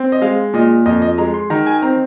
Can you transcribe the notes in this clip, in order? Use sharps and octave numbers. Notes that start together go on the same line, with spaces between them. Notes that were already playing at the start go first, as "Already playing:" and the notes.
Already playing: C4
D#5
G#3 F5
A#2 D#5
F2 D#5
D#5
G#3 A#5
C6
D#3 A#5
G#5
C4 A#5